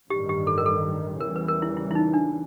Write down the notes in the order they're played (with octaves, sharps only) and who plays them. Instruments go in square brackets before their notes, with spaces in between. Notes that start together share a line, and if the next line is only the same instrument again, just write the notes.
[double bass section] A1 G2 D#3 G3 [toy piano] G4
[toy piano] G4
A4
A#4
A4
[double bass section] E2 C#3 E3 G3 [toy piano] A#4
[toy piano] B4
A#4
E4
E4
E4
D#4
D4